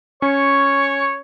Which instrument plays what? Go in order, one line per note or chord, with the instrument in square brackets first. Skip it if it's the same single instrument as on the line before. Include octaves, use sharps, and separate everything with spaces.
[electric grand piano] C#4 [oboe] C#5 [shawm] C#6